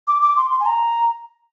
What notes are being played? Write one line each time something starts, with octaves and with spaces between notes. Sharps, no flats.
D6
D6
C6
C6
G#5
A#5